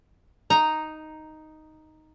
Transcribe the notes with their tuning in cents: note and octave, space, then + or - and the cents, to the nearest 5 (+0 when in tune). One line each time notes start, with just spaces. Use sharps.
D#4 +0 A#5 +0